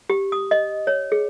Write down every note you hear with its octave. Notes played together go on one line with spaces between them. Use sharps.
G4
D#6
D#5
C#5
G#4